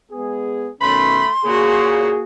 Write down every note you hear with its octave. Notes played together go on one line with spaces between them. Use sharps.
G#3 B3 G#4
B2 D#3 A3 C#4 B5 C6
A#2 C#3 A#3 F#4 G#4